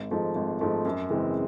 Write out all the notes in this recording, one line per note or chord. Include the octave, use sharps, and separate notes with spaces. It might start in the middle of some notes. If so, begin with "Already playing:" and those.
Already playing: G#1
G#2 F3 A3
G#1
G#2 F3 A3
F#2
C#3 E3 G#3 C4